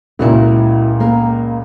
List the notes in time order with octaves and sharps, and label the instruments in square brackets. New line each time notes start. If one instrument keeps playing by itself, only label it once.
[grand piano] C#2 A#2 [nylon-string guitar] E4 F#4 A#4
[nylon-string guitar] A#3 A#4